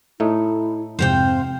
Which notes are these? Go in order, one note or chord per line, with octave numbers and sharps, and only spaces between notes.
A2 A3 D#4 E4
F2 G#2 C3 C4 C5 F5 G5